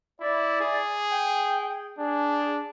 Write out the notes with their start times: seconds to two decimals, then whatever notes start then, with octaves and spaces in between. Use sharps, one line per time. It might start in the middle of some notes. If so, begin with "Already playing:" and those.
0.21 E4 D5
0.61 G#4
1.11 G5
1.99 D4 G#4